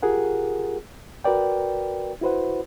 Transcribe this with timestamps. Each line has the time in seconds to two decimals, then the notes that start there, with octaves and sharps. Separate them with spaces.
0.02 F4 G4 G#4 A#4 F#5
1.24 F#4 A#4 B4 D5 G5
2.21 E4 F#4 B4 C5 F#5